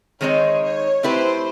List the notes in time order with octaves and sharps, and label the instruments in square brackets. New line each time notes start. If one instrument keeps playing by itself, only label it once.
[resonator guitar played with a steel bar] D#3 G#3 C4 D#4 G#4 [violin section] C#5
[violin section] C#5
[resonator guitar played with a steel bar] A3 C4 E4 G4 B4 [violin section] C5